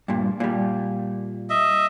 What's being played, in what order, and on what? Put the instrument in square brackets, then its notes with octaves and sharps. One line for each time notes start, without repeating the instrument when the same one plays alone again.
[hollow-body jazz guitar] G2 A#2
A#2 G3
[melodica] D#5 E5